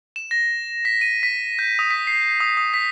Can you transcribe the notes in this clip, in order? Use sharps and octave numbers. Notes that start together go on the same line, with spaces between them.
E7
A#6
B6
D#7
B6
G6
D#6
B6
C7
D#6
D#6
B6